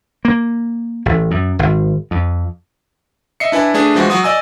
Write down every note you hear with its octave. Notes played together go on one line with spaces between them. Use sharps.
A#3
A1
F#2
G#1
F2
D#5 E5 C7 C#7
D4 E4 B4 G#5
A3 D4 G#4 B4
E3 F3 G#3 F#4
F#3 F#4 D#6
D5 D#5 G#5 E6